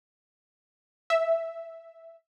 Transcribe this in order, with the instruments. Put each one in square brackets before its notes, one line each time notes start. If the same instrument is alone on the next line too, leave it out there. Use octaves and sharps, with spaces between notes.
[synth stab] E5